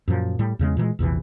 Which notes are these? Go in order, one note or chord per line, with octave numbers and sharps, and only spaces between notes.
F#2 A#2 F3
A2 G3
E2 C#3 G#3
A#2 E3 F#3 G#3
A#1 E2 C3 E3